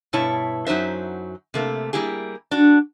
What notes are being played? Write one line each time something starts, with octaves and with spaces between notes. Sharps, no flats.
G2 B2 E4 C#5 A5
F#2 F#3 D#4 C5 E5
C3 A3 A#3
G3 A#3 E4 G4 G#4
D4 F#4